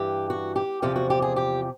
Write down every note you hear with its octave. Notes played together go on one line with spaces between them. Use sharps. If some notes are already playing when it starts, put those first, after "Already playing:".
Already playing: G2 E3 G4
F#4
G4
E2 C3 F3 G4
F#4
G4
G#4
G4